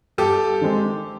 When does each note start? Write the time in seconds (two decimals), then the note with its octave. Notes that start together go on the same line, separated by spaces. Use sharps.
0.18 G2 G4 A4
0.61 D#3 G#3 C4 D#4